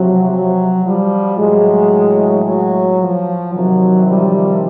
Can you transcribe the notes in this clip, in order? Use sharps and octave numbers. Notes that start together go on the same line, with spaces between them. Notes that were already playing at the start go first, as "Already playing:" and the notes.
Already playing: C3 F3 F#3
F#3
F3 G3
A2 E3 F#3 G#3
F#3
F3
C3 D#3 F#3
F3 G3